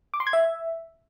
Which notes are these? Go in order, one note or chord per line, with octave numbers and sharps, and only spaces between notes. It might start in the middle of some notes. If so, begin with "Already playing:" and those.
D6
C6
G#6
E5